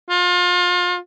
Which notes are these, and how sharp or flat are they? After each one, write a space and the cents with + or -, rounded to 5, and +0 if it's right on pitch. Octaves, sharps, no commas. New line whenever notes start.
F4 +30